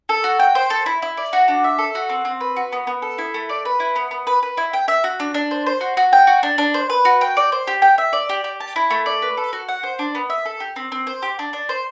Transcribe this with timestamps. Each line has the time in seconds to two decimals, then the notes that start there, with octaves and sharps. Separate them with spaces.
0.09 A4
0.24 F#4
0.40 G5
0.55 C5
0.70 A4
0.86 E4
1.02 E4
1.17 D5
1.33 F#4
1.48 D4
1.64 E5
1.78 A4
1.95 F#4
2.10 C4
2.25 C4
2.41 B4
2.57 F#4
2.73 B3
2.87 B3
3.02 A4
3.18 E4
3.34 A3
3.49 D5
3.65 B4
3.80 E4
3.96 B3
4.11 B3
4.27 B4
4.43 B4
4.57 E4
4.73 G5
4.88 E5
5.04 F#4
5.20 D4
5.34 D4
5.51 C5
5.66 C5
5.81 F#4
5.97 F#4
6.13 G5
6.27 F#4
6.43 D4
6.58 D4
6.74 C5
6.90 B4
7.05 F#4
7.21 G5
7.37 D5
7.52 C5
7.67 G4
7.82 G5
7.98 E5
8.13 D5
8.29 G4
8.44 G4
8.60 A5
8.76 E4
8.90 A3
9.06 D5
9.22 B4
9.37 A4
9.53 F#4
9.68 F#5
9.83 C5
9.99 D4
10.15 B3
10.30 E5
10.45 A4
10.60 G4
10.76 C4
10.92 C4
11.07 C5
11.22 G4
11.39 D4
11.53 D4
11.69 C5